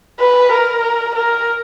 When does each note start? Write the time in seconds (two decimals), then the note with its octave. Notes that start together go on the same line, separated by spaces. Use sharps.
0.20 B4
0.52 A#4
1.15 A#4